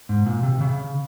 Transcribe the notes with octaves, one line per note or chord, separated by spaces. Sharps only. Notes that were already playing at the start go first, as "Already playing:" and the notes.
G#2
A#2
C3
C#3